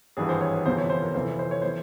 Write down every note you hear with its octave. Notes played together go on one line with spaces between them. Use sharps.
G#1 G2 E3 G#4
C5
C#5
C5
G1 F2 C3 E3 C5
C#5
C5
A#4
F1 F2 E3 C5
C5
C#5
E3 C5